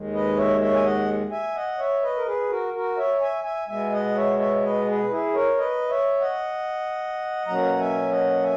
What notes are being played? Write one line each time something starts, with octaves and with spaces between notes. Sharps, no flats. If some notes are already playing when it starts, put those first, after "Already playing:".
Already playing: D#2 D#3 G#3
B4 D#5
C#5 E5
C#5 E5
G#5
D#5 F#5
E5 G#5
D#5 F#5
C#5 E5
B4 D#5
A#4
G#4 B4
F#4 A#4
F#4 A#4
C#5 E5
E5 G#5
E5 G#5
B2 G#3 B3 E5 G#5
D#5 F#5
C#5 E5
C#5 E5
B4 D#5
G#4 B4
E4 G#4
A#4 C#5
B4 D#5
C#5 E5
D#5 F#5
B2 F#3 A#3 C#4 F#5 A#5
E5 G#5
D#5 F#5
E5 G#5